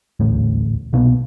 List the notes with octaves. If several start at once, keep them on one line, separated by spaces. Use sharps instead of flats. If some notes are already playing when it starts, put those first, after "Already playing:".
D#1 A1 D2 A2
C2 B2 A#3 B3